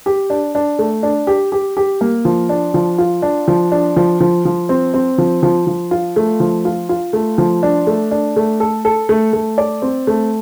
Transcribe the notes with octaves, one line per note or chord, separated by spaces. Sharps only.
G4
D4
D4
A3
D4
G4
G4
G4
A#3
F3
D4
F3
F4
D4
F3
D4
F3
F3
F3
C4
C4
F3
F3
F3
F4
A3
F3
F4
F4
A3
F3
D4
A3
D4
A3
A4
A4
A3
A3
D5
C4
A3